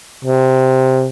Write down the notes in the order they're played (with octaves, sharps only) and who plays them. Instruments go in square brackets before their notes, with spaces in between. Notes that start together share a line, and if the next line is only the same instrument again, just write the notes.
[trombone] C3